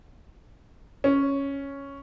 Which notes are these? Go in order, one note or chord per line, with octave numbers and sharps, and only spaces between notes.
C#4